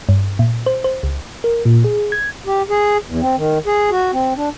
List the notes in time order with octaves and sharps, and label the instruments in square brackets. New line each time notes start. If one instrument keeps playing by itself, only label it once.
[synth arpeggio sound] G2
A#2
C5
C5
C#2
[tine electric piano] A#4
A#2
G#4
G#6
[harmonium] G4
G#4
E2
C4
D#3
G#4
F#4
C4
D4